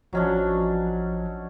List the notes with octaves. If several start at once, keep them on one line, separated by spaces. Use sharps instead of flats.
A1 F3 F#3 C#4 D4 D#5